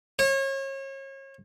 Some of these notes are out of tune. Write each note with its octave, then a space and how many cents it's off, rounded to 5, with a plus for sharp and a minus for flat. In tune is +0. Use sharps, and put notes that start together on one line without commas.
C#5 -35